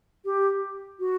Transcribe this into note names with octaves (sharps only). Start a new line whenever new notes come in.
G4
F#4